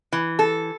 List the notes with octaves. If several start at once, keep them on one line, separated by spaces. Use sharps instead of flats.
E3
A4